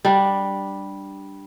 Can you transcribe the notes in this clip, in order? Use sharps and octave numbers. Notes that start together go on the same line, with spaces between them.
G3 D4